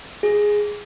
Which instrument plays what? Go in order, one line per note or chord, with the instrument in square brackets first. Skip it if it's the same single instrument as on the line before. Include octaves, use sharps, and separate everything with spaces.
[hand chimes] G#4